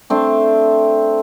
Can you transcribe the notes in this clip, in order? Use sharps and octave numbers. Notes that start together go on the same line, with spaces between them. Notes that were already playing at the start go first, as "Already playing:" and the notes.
A3 C4 D4